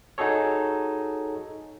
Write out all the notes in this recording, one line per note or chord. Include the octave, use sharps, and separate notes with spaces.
D#4 F#4 G#4 A4 C#5